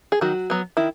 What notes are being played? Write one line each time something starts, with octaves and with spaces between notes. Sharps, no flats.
G#4
D#3 F#3 F#4
F#3 B3
D#3 E4